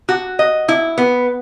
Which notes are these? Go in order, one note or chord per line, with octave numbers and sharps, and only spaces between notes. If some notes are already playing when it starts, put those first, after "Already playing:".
F#4
D#5
E4
B3